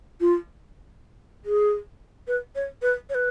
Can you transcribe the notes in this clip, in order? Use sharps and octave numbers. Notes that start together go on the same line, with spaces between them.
F4
G#4
B4
C#5
B4
C#5
B4